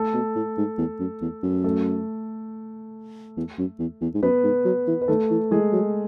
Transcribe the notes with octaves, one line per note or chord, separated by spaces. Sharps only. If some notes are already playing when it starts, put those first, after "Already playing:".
Already playing: A3 A4
B2
A2
G#2
E2
F#2
E2
F#2
A3 A4
E2
F#2
E2
E2
G#2
F#2 B3 B4
G#2
F#3
E3
B4
D#3 A3 A4
E3
E3 G#3 G#4
F#3